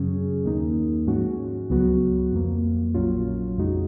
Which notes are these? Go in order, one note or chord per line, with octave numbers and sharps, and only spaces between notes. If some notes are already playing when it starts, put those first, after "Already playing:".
Already playing: F#2 C#3 F#3 C#4 G#4
D#2 D#3 A#3 D#4
G#2 F3 G#3 C#4 F#4
C#2 C#3 F#3 B3 F#4
F2 F3 A#3
A#1 A#2 F#3 C#4 F4
F2 C#3 G#3 D#4 F#4